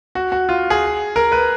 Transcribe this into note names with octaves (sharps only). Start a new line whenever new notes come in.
F#4
F#4
F4
G#4
A#4
B4